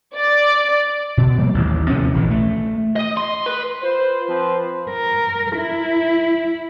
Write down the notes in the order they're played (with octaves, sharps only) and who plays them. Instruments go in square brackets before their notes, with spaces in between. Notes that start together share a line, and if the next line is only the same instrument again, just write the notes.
[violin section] D5
[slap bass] B2
F3 G3 A#3
A1 D#2
D#2 C3 F3 C#4
A#1 D#3 E3
A3
[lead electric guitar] D#5
C6
B4
[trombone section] F4 B4 C5
F3 C4 B4 C5
[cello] A#4
E4